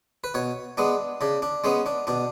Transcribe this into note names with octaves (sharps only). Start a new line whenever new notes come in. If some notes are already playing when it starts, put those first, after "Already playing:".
B4
B2 C#5
G#3 B3 D4
C#3 D4
D4
G#3 B3 C#4
D4
B2 D4